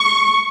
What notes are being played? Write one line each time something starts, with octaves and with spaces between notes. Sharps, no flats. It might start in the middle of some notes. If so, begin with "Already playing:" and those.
Already playing: C#6